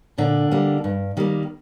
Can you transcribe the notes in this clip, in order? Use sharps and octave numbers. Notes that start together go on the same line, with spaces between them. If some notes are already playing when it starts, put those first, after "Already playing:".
A#2 D3 D4
G3 A#3
G2
D#3 G3 A#3